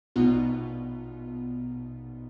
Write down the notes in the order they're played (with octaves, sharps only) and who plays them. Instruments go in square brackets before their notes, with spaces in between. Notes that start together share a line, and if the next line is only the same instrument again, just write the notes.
[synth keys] A#1 B2 B3 D#4 F4